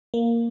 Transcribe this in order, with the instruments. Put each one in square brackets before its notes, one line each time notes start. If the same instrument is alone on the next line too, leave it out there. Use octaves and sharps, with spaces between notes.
[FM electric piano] A#3